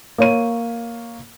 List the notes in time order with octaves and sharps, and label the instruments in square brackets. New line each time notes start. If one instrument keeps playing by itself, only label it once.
[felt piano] A#3 C#5 D#7